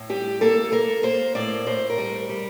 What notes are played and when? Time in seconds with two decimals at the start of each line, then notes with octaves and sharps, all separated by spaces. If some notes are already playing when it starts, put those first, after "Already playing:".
Already playing: A2
0.09 G3 G4
0.41 A#3 A4
0.72 A#3 A#4
1.03 A#3 C5
1.35 A2 D5
1.66 A2 C5
1.90 A#4
1.98 G3
2.29 G3